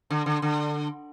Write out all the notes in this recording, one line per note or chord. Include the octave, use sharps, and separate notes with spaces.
D3
D3
D3